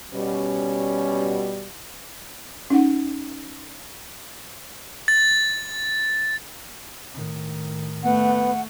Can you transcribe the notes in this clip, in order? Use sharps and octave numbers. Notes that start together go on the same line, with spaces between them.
B2 G3 C#4
C#4 D#4 F#5
A6
A2 D#3
A3 B3 F#5